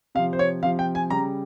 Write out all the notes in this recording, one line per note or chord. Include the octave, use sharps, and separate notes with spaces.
C3 F3 F5
C5
C#5
C3 F3 F5
G5
G#5
C#3 G3 A#5